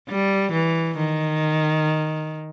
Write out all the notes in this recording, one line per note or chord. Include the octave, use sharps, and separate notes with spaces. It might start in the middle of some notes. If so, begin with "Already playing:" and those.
G3
E3
D#3